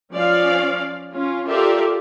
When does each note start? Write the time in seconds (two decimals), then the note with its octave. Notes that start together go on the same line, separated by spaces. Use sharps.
0.12 F3 C#4 D5 F5
1.11 C#4 F4
1.48 F4 G4 A4 A#4 D5 E5